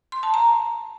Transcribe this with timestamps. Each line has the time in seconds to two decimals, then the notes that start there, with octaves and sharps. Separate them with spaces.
0.12 C6
0.23 A5
0.34 A#5